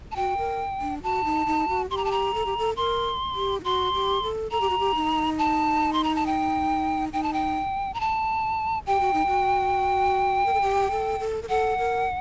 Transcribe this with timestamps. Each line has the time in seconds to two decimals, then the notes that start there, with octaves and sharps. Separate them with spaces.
0.12 A5
0.16 F#4 G5
0.38 A#4
0.81 D4
1.03 F#4 A5
1.24 D#4
1.46 D#4
1.68 F#4
1.90 G4 C6
1.97 A#5
2.05 A5
2.11 A#5
2.34 A4
2.46 G4
2.58 A4
2.77 A#4 C6
3.35 G4
3.60 D#4
3.64 F#4 C6
3.94 G4
4.22 A4
4.51 A4 A#5
4.61 G4
4.70 F#4
4.79 G4
4.95 D#4
5.39 A5
5.93 C6
6.04 A#5
6.15 A5
6.26 G5
7.13 D#4 G5
7.23 A5
7.33 G5
7.94 A#5
8.00 A5
8.87 G4 G5
9.00 F#4
9.13 D#4
9.27 F#4
10.46 A#4
10.54 A4
10.61 G4
10.91 A4
11.20 A4
11.42 A#4
11.49 A4 F#5
11.78 A#4